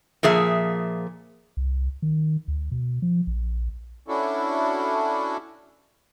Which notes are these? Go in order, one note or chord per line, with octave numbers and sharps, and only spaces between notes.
A#2 F3 G#4 E5
C2
D#3
D2
B2
F3
A#1
C#4 D4 E4 F#4 A4